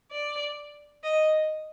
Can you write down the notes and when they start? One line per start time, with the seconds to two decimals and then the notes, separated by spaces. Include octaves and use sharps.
0.11 D5
1.03 D#5